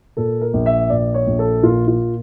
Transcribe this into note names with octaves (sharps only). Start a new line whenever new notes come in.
A#2 A4
A#4
A#1
E5
A#2 D5
C#5
A#1
A4
A#2 F4
F4